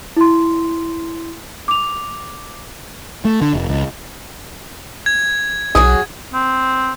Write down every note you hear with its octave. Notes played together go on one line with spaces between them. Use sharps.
E4 C6
D6 F7
A3
D3
F1
C#2
G#6
B1 F#3 F#4 G#4 D#6
C4